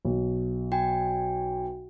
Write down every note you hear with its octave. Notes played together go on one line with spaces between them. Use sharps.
B1
F#4 G5 G#5